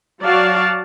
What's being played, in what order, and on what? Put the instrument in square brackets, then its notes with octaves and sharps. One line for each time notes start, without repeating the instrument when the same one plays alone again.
[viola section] F#3 F#4 D5 F5 A5